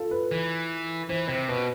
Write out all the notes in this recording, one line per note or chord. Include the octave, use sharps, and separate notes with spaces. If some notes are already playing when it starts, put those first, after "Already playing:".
Already playing: F4 A4
B4
E3
E3 C5
C3 C5
B2 B4